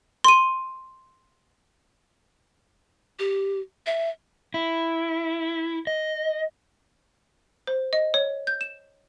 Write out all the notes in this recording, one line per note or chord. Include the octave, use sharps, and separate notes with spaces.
C6 D#7
G4
E5
E4
D#5
C5
D#5
C#5
G6
E7